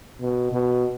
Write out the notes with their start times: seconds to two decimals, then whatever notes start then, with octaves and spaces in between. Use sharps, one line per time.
0.21 B2
0.52 B2